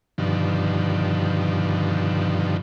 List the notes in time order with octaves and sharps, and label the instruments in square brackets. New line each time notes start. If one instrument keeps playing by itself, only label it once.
[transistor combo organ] G2 B2 D3 D#3 F3